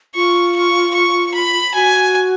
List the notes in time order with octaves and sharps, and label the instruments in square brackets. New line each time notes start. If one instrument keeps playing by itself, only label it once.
[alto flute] F4 [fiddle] C#6
[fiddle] C#6
C#6
B5
[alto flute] F#4 [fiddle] G#5